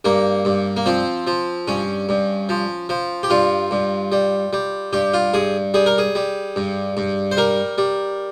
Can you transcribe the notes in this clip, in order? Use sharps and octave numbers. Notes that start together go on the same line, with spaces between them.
G2 A#3
G2
A#3
F3 C4
F3
G2 C#4
G2
F3
F3
G4
G2 F4
G2
G3
G3
G2 G4
F4
G2 G#4
G3 G#4
A#4
G#4
G3
G2
G2
C5
G3 A#4
G3